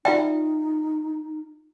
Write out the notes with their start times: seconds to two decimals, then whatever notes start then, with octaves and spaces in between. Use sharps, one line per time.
0.05 D#4 F4 D5 E5 G5